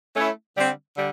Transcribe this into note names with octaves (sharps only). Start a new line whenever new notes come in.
A3 C#4 E4
D3 G3 C4
D3 G3